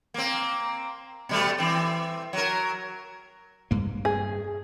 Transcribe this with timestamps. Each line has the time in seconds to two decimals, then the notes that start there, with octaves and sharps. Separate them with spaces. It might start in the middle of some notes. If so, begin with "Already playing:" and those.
0.14 A#3 C4
1.29 B2 G3 A3
1.58 E3 C4
2.33 F#3 A#4
3.71 G2 A#3
4.05 G#4